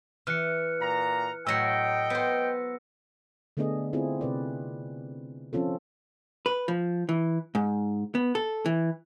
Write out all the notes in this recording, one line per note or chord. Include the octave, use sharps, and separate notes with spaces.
E3 F6 F#6 C#7
A#2 A#5
A2 F#3 D#5 G5 E6 A#6 C#7
B3 C5
D3 A3 B3 D4 G#4 D#5
C4 E4 F4 G#4
C3 B4 D5
F3 C4 C#4 F4 A4
B4
F3
E3
G#2
B3
A4
E3